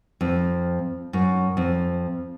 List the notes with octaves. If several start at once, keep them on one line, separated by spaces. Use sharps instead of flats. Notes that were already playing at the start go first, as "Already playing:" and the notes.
F2
F#2
F2